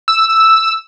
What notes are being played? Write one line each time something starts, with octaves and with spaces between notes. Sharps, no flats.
E6